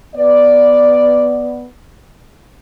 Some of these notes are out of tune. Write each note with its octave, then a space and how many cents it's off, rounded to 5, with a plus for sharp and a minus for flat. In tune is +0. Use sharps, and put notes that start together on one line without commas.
B3 +0 D5 +0